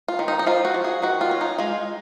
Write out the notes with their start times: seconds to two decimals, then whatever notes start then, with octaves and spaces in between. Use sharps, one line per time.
0.08 F4
0.19 D#3
0.28 D#4
0.39 D#4
0.47 F3 F4
0.65 F#4
0.74 F3
0.84 G#4
1.02 D#3 F#4
1.21 F4
1.31 C#4
1.41 D#4
1.58 G#3 F4